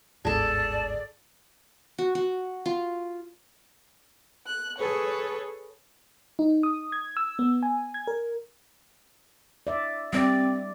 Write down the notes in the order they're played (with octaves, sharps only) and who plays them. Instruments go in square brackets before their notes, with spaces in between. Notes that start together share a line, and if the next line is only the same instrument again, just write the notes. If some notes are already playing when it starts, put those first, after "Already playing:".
[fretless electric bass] G1 D2 G#2 [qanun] G#4 A4 [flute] D5 [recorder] A5
[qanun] F#4
F#4
F4
[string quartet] F#6
G#4 A4 B4 C#5
[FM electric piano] D#4
D#6
G#6
E6
B3
G#5
G#6
A#4
[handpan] D5 E5
[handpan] G3 D5 [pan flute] C4